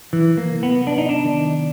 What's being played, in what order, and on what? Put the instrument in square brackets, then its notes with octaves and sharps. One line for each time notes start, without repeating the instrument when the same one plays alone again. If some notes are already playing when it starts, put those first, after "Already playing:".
[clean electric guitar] E3 [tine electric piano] F#3
[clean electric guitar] A#3
[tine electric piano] C3
[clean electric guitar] B3
[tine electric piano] B3 [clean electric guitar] D4
[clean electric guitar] D#4
D4
[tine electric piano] D#3